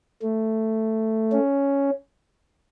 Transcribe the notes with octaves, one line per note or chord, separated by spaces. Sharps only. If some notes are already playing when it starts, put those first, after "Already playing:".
A3
C#4